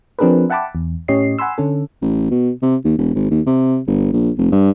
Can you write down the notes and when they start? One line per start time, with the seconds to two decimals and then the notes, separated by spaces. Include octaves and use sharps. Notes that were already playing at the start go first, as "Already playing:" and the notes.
0.19 F3 C4 D4 G#4 A#4 B4
0.50 E5 F#5 G5 A5 B5 D6
0.75 E2
1.08 A2 C#4 G4 C#5 D#5 C7
1.39 F#5 G#5 B5 C6 E6
1.58 D3 C#4 A4
2.02 A1
2.31 B2
2.63 C3
2.85 D#2
2.98 E1
3.15 G#1
3.31 D#2
3.46 C3
3.87 G1
4.13 A#1
4.38 F1
4.52 G2